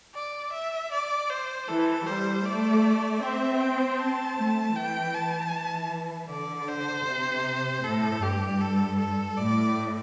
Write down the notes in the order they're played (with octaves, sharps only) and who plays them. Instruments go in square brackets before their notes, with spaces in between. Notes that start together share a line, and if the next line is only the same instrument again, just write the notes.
[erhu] D5
E5
D5
C5
[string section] E3 [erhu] A4
[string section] G3 [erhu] C5
[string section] A3 [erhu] D5
[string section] C4 [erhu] E5
[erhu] G5
A5
[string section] A3
[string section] E3 [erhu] G5
[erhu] A5
[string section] E3
[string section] D3 [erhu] D5
[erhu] C5
[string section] C3
[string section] A2 [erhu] A4
[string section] G2 [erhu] G4
[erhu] A4
A4
[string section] A2 [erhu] D5